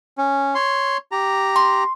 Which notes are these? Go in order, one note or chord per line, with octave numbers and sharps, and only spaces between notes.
C#4
C#5 C6
G4 A#5
C6